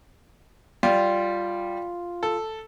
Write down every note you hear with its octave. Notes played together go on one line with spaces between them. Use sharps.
G3 F4
A4